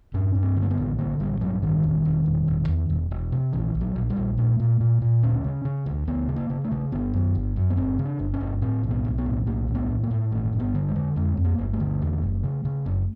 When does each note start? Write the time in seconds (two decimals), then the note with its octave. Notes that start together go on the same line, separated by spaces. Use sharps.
0.14 G2 C#4
0.35 G2
0.43 C4
0.56 D3
0.62 A#3
0.71 B3
0.77 A1
0.99 D3 A#3
1.20 A1 G3
1.41 G2 F#3
1.62 A1 D#3
1.83 E1
2.05 E1
2.26 E1
2.47 E1
2.68 E2
2.89 E1
3.11 E1
3.32 C3
3.53 A#1 E3
3.75 A#1
3.81 F#3
3.96 A#1
4.10 G3
4.16 A#1
4.38 A#2 A3
4.60 A#2
4.80 A#2
5.01 A#2
5.23 D2 C#4
5.44 C#3
5.65 C#3
5.86 D2
6.07 D2 B3
6.29 C#3
6.36 A#3
6.50 C#3
6.64 A3
6.72 C#3
6.92 G1 B3
7.14 F#2
7.35 G1
7.56 F#2
7.70 B3
7.77 G1 C4
7.99 C#3
8.05 D4
8.19 G1
8.34 C#4
8.41 G1
8.61 A2 C4
8.83 B1
8.91 B3
9.05 B1
9.18 B3
9.26 A2
9.47 B1 A#3
9.68 A2
9.75 B3
9.89 A2
10.03 A#3
10.11 A2
10.31 G1 A3
10.53 G1
10.60 B3
10.74 D3
10.89 G#3
10.95 D3
11.16 F2 G#3
11.37 F2
11.45 A#3
11.58 G1
11.73 A3
11.80 D3
12.01 E2
12.22 F#1
12.44 C#3
12.65 C#3
12.86 F#1